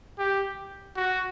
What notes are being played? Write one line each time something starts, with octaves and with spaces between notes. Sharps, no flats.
G4
F#4